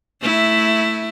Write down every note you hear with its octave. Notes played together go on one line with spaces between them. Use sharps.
A3 E4